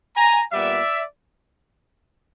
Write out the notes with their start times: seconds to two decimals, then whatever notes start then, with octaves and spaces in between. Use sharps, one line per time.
0.16 G#5 A#5
0.53 A#2 G3 B3 D5 E5